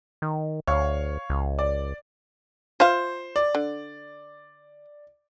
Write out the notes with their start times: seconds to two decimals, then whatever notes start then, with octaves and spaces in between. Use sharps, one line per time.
0.22 D#3
0.67 D2 C#5 F5
1.30 C#2
1.59 D5
2.80 F4 C5 E5 F5
3.36 D5
3.55 D3